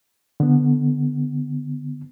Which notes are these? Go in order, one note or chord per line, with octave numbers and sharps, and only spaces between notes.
D3 B3